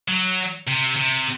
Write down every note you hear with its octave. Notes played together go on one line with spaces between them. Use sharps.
F#3
C3
C3